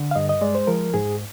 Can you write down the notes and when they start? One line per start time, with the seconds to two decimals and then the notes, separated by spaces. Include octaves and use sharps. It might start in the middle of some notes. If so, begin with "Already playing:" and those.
Already playing: D3
0.11 F5
0.15 G2 D#5
0.29 D#5
0.41 G#3 D5
0.55 C5
0.67 F3 A#4
0.94 G#2 G#4